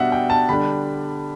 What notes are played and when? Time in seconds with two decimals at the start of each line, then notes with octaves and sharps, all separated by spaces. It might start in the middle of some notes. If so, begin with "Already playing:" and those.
Already playing: B2 G3 D4 E5 F#5
0.12 G5
0.30 A5
0.49 D3 G3 D4 B5